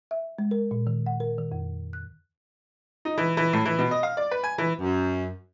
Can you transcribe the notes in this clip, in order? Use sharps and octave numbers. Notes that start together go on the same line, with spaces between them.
E5
G#3
A#4
A#2
D#3
F#5
A#4
D#3
F2
F#6
D#4
E3
E3
A2
E3
B2
D#5
F5
D5
B4
G#5
E3
F#2